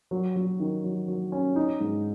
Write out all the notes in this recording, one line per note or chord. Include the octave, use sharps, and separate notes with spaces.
F#3
F#3
D#3
F#3
F#3
C#4
D#4
G#2